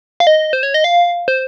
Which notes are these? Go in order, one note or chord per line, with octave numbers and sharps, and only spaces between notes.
F5
D#5
C5
C#5
D#5
F5
C5